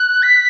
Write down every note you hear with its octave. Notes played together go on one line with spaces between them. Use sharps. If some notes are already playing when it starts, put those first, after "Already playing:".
Already playing: F#6
B6